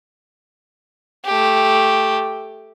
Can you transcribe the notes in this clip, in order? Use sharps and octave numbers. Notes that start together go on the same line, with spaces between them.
A3 G4